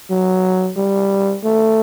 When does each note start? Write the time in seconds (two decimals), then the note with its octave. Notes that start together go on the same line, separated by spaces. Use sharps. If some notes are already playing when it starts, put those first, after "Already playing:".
0.10 F#3
0.77 G3
1.44 A3